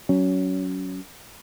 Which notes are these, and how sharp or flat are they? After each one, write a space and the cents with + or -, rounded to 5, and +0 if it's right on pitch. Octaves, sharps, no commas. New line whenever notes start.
F#3 +15 C#4 +20